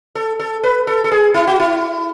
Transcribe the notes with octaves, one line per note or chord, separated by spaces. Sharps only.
A4
A4
B4
A4
A4
G#4
E4
F#4
E4